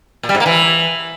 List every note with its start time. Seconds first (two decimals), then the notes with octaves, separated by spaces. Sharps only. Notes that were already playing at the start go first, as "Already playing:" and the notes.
0.23 A#2
0.29 G3
0.35 G#2
0.40 A#3
0.46 E3